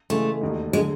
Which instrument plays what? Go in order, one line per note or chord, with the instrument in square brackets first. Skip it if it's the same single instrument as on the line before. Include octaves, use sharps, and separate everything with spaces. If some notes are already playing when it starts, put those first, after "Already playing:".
[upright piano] C#3 E3 G#3 [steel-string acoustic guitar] A3
[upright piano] E1 D#2 D#3
[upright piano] D3 F#3 [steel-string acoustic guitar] G#3